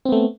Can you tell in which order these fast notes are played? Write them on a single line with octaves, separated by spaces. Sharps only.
C4 B3 A3